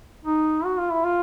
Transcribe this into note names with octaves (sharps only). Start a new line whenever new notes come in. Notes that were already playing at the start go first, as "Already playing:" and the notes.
D#4
F#4
F4
E4
F4